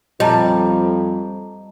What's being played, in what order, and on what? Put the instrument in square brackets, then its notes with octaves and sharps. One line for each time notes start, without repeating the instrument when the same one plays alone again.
[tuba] F2 [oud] G3 [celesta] D#5 A5 A#5